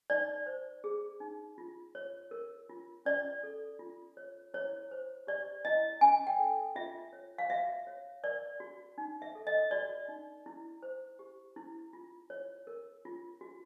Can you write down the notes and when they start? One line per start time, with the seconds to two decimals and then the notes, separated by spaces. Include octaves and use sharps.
0.10 D#4 D5
0.46 C5
0.84 G#4
1.20 D#4
1.58 F4
1.95 C#5
2.31 A#4
2.69 F4
3.05 C#4 D5
3.43 A4
3.79 F4
4.17 C#5
4.54 E4 C#5
4.91 C5
5.27 G4 D5
5.65 E4 D#5
6.01 C#4 G#5
6.27 G5
6.39 A4
6.76 F4 E5
7.13 C#5
7.38 F5
7.50 F#4 E5
7.87 C#5
8.23 A#4 D5
8.60 F#4
8.98 D#4
9.22 E5
9.35 A4
9.47 D#5
9.71 F#4 D5
10.08 D#4
10.46 E4
10.83 C5
11.19 G4
11.56 E4
11.93 F4
12.30 C#5
12.67 A#4
13.05 F4
13.41 F#4